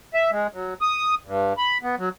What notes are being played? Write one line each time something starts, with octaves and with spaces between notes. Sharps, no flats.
E5
G#3
F#3
D#6
G2
B5
B3
F#3